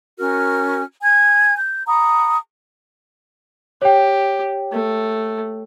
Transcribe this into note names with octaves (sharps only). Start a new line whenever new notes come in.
C#4 F#4 A#4 F6
G#5 G#6
G6
F#5 A#5 B5 D#6
G4 C#5 G5
A3